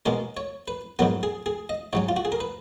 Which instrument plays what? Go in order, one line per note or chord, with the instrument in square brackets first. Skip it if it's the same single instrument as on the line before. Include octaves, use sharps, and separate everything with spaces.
[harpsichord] B2 G#3 C#4 A#4
C#5
B4
G#2 F#3 B3 A#4
G#4
G#4
D#5
G#2 F#3 C#4 C#5
F4
F#4
G#4
A#4
B4